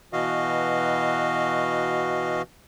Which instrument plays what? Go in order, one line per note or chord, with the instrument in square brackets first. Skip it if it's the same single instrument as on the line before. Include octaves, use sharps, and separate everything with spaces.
[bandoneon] B2 E3 F#4 D#5 F5